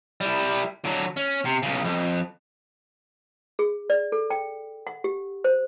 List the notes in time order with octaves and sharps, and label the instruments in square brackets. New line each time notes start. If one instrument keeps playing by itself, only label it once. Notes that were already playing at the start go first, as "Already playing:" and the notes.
[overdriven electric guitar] G3 E4
D3 F#3
C#4
C3
B1 C#3
F2
[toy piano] G#4
D5
A4
G5
F#5
G4
C5